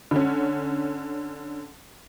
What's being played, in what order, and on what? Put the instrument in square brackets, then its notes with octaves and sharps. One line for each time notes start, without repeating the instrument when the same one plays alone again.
[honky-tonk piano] D3 C#4